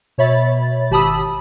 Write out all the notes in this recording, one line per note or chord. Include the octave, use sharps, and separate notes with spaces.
B2 C#5 E5 B5 A6
G#1 G4 A5 B5 D#6 E6